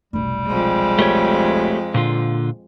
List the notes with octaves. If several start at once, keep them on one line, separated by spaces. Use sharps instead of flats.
F1 B1 G3
F2 G#3
A3 G4 C#5
A#2 D3 F4